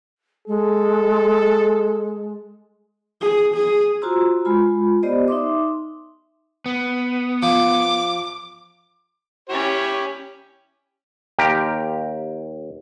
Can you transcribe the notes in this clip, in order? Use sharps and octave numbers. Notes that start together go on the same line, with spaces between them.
G#3 A4
G#4
G#4
F4 F#4 C5 A#5 C6 E6
G#3 F4 B5
B3 G4 C5 D5 D#5
D#4 E5 C6 D6
B3
F3 D6
C#4 E4 G4 C#5
D#2 G4 A#4